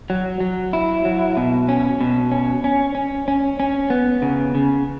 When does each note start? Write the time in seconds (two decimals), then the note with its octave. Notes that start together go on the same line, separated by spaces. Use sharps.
0.10 F#3
0.40 F#3
0.73 E4
1.05 F#3
1.37 B2
1.69 C#4
2.01 B2
2.31 C#4
2.64 C#4
2.95 C#4
3.28 C#4
3.60 C#4
3.90 B3
4.22 C#3
4.55 C#3